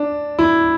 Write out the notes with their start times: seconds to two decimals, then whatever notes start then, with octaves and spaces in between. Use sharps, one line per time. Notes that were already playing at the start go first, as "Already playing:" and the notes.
Already playing: D4
0.39 E4